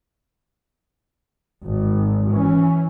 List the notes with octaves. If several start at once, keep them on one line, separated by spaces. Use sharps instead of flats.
G#1
E3 C#4